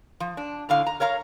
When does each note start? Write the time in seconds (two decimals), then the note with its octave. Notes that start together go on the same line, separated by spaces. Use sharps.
0.20 F3
0.37 D4
0.69 A2 D3 F5
0.87 A#5
1.00 A#4 C#5 F5 A#5